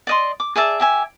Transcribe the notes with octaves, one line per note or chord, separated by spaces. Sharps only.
D5 D#5 C6
D6
G#4 D5 E5 A5
G4 E5 G#5